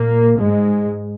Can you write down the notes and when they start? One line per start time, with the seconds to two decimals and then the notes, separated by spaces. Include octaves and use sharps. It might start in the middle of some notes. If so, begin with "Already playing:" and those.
Already playing: A#2 A#3
0.37 G#2 G#3